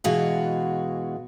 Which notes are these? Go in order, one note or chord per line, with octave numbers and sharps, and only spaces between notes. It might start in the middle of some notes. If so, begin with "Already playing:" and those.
B2 E3 G#3 F4 F#4